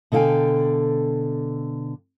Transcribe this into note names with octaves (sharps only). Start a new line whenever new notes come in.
B2 D3 A4 F5 G5 G#5